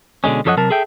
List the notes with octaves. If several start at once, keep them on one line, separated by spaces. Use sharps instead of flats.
B2 D3 G#3 C#4
F#2 F3 A4 C#5 D#5 F#5
C3 F#3 A#4 A5
G#4 A4 E5 G5